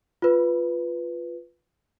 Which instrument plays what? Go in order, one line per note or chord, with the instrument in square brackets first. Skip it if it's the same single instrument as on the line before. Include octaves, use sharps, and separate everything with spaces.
[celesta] F4 B4